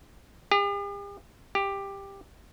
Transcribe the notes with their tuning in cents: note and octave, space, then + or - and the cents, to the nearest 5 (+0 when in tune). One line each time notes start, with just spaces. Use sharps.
G4 +45
G4 +10